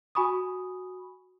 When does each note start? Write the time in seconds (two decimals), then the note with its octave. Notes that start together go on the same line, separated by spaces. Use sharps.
0.15 F#4 G#5 B5 C#6 D#6